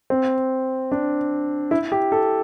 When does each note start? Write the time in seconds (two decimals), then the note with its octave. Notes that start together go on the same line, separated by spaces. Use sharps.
0.10 C4
0.92 D4
1.71 E4
1.92 G4
2.12 A4